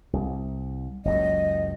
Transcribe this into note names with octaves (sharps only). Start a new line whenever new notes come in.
C2
F#1 C#2 F#3 D#5